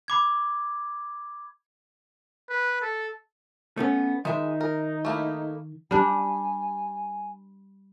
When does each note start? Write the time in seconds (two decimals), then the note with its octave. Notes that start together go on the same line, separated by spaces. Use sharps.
0.08 B5 D6 G#6
2.49 B4
2.81 A4
3.77 A3 B3 C#4
4.25 D#3 G#3 D#4 E5
4.61 A#4
5.05 A3 A#3 E4
5.91 G3 D4 G#5